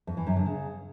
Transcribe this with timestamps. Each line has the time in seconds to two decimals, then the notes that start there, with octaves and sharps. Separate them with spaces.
0.07 F2
0.17 E3
0.27 F#2
0.36 D3
0.46 C#3